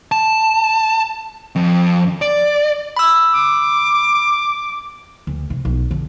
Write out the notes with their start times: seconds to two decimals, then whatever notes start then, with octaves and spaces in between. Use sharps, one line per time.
0.12 A5
1.56 F2
2.22 D5
2.97 B5 E6
3.33 D6
5.27 D2
5.50 C3
5.65 B1
5.91 D3